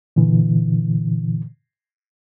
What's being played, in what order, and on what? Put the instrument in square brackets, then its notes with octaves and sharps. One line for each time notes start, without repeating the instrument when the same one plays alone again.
[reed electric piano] A#2 D3 E3